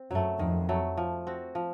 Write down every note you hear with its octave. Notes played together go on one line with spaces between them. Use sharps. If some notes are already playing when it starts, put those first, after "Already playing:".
Already playing: C4
F#2 F#3 A3
F2 D#3
F#3 A3
F3
C4 F#4
F3